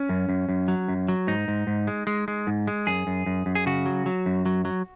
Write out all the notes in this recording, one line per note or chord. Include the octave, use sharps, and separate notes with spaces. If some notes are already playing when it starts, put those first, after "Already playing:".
Already playing: C#4
F#2
F#2
F#2
F#3
F#2
F#3
G#2 D#4
G#2
G#2
G#3
G#3
G#3
G#2
G#3
F#2 G#4
F#2
F#2
F#2
G#4
C#3 F#4
F#3
F#3
F#2
F#3
F#3